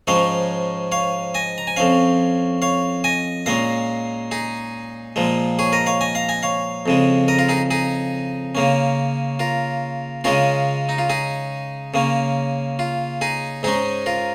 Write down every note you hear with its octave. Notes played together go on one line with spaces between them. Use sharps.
G#2 F3 G#3 C#4 C#5 F5
C#5 F5
D#5 G#5
A#5
G#5
F2 F3 C#4 C#5 F5
C#5 F5
D#5 G#5
A#2 G#3 C#4 F5 A#5
D#4 G#4
A#2 F3 G#3
G#4 C#5
A#4 D#5
C#5 F5
D#5 G#5
F5 A#5
D#5 G#5
C#5 F5
F2 C#3 G#3
A#4 D#5
F4 A#4
D#4 G#4
D#4 G#4
C#3 A#3 C#4
F4 A#4
C#3 G#3 C#4 F4 A#4
D#4
F4
D#4 G#4
C#3 A#3 C#4
F4
D#4 G#4
G#2 G#3 C#4 D#4 G#4
F4 A#4